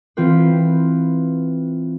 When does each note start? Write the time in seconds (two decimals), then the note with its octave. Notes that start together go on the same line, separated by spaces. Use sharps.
0.17 E3 C4 F4 B4